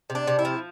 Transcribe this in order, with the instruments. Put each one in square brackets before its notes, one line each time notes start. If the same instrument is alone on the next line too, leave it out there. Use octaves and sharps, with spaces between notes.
[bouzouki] C3
D4
C3
E4
F3